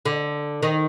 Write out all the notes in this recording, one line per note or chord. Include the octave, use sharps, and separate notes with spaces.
D3
D#3